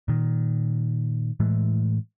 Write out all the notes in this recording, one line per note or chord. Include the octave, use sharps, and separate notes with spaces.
A#2 D#3
A2 E3 G#3 A3